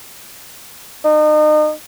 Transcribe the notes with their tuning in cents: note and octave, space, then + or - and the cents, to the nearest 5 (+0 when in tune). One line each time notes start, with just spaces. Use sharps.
D#4 -35